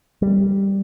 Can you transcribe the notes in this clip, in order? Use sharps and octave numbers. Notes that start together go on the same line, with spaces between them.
G3